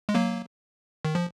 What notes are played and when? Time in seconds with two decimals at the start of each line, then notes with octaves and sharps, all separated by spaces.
0.09 G#3
0.15 F#3 A#3
1.05 D#3
1.15 F3